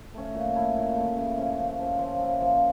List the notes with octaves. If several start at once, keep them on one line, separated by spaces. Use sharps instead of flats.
A3 C#4
A#2
A3 E4
A#2
A3 E4
C#3
F3 C#4
C#3
F3 C#4
F3
A#3 E4
F3